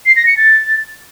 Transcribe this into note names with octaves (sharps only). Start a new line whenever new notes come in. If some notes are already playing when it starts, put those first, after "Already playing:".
C7
A#6
C#7
A6